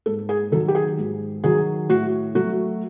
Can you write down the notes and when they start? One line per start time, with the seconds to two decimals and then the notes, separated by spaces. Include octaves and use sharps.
0.06 G#2 A4
0.29 G#4
0.52 D#3 F#3 A4
0.68 G4
0.75 G#4
0.98 G#2
1.44 D#3 F#3 G#4
1.89 A2 F#4
2.35 F#3 A3 F#4